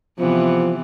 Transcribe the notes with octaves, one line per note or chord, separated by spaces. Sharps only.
C3 E3 F3 B3